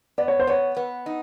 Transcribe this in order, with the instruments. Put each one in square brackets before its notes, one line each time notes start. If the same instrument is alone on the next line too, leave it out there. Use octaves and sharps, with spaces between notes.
[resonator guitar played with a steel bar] B3 [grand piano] D5
[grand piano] C#5
C5
[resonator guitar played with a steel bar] B3 [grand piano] C#5
[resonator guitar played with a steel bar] B3
D#4